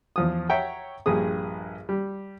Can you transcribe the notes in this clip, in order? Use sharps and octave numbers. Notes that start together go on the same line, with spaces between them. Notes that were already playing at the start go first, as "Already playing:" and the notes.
E2 F3 D#6
C#5 E5 F#5 G5 A#5
A#1 G2 G#4 D#6
G3